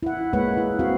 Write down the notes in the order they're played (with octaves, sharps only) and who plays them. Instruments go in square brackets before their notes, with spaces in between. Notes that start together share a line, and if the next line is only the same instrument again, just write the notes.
[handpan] E4 F#5
G#3 A#3 E4 B4 C#5 F#5
E4
C4 F#4 B4 F5